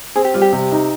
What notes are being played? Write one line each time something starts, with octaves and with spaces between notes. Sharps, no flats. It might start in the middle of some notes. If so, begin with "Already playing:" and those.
C4 G#4
G4
G3 F4
G4
C3
D#4